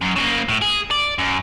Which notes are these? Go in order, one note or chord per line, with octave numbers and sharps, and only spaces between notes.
F#2
C#3 A#3
A2
G#4
D5
F#2